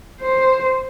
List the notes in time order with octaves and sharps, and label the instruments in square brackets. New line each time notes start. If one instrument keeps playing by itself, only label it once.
[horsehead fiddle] C5